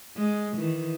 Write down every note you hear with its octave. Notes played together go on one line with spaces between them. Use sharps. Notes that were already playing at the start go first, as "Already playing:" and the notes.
G#3
D#3 E3